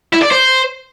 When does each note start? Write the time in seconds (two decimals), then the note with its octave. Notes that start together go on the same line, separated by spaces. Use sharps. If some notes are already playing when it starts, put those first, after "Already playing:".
0.13 E4
0.22 D5
0.31 C5